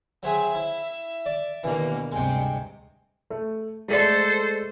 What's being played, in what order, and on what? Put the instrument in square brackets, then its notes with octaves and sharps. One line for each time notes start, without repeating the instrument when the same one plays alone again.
[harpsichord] F#3 C4 G#4 [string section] E5
[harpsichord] E4
D5
[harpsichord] D#2 E3 [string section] B2 D3 A#3
[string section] D2 G2 C3 [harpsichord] G#3 G5
[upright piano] A3
[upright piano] G#3 A3 D5 [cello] A4 C5